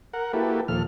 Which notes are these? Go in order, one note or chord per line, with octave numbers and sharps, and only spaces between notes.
A#4 F#5
A#3 E4 F#4 G4 A4 B4
D#2 A#2 F3 A4 F6